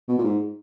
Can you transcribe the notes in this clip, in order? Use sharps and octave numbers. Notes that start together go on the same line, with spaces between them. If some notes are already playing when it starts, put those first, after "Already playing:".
B2
A#2
G#2